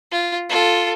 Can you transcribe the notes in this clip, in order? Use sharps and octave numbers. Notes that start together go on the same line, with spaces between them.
F4
F4 A4